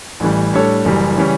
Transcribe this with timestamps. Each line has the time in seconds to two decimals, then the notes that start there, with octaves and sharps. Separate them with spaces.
0.20 A1 A2 E3 G3
0.53 A2 G3 D4 A4 C#5
0.85 F#1 F#2 E3 G3
1.17 C#3 E3 G3 C#4